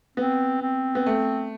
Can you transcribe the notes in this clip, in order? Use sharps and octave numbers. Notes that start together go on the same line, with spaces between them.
B3 C4
C4
B3
A3